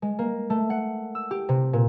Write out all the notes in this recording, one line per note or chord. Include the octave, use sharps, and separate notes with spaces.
G#3
A#3
A3
F#5
E6
G4
C3
A#2